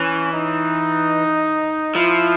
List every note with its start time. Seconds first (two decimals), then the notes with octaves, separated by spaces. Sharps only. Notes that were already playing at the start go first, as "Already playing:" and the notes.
Already playing: E3 C#4
0.33 D#4
1.95 F3 E4